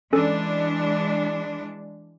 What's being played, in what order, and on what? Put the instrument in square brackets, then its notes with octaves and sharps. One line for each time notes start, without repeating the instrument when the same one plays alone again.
[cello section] E3 G#3 D4 [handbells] C#4 A4